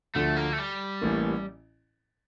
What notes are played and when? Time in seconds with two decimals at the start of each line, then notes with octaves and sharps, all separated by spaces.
0.15 D2 D3 F3 A3
0.37 A#3
0.53 A3
0.59 G3
1.01 A1 A2 E3 A#3